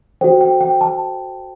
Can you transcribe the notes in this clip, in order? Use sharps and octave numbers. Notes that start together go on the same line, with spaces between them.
F#4 A4 C5 G5
G5
G5
A5